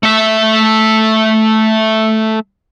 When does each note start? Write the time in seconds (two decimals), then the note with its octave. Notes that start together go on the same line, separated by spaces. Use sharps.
0.03 A3 E5